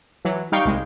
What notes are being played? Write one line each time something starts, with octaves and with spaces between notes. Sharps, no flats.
E3 F#3
G3 D#4 F5 G5 C#6 G6
C2 G#3